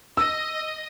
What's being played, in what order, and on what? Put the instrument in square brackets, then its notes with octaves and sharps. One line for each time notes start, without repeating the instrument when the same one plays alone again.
[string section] D#5 [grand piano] E6